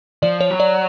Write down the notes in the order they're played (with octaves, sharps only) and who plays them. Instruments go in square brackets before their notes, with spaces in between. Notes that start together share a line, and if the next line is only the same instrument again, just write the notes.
[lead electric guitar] F3 [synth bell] D5
[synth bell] C#5
[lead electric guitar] F#3
[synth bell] D5